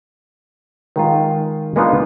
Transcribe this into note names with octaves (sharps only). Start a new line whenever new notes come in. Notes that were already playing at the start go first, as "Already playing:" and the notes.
D#3 G#3 F4
G#3 A#3 B3 D4 D#4 F4